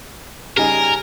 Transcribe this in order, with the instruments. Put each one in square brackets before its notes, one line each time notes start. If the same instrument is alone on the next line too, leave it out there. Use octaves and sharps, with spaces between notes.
[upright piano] C#3 G3 D#4 [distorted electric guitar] A#4 [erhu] G#5